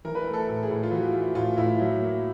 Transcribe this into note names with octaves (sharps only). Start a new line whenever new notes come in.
E3 A#4
B4
A3 A#4
A4
A2
G#4
A2
F4
E3 F#4
A3 F4
A2 F4
A2 E4
F#3
A#3